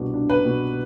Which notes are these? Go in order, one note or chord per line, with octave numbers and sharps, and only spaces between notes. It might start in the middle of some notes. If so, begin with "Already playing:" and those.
Already playing: C2 B2 D4
D4
B4
B2